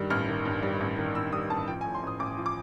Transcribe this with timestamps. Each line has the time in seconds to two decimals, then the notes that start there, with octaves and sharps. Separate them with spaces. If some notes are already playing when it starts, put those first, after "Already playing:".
Already playing: G2 D#3 G3
0.10 A1 F6
0.28 D#3
0.45 G2
0.63 G3
0.81 A1
0.98 D#3
1.15 G2 E6
1.32 G3 D#6
1.50 A1 A5
1.68 F3 G5
1.81 G#5
1.85 A2
1.94 C6
2.03 A1 D#6
2.19 A1 D6
2.37 F3
2.46 D6